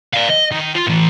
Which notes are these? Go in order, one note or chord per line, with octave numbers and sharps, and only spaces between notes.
D5 F5
D#5
D#3
F4
A2 E3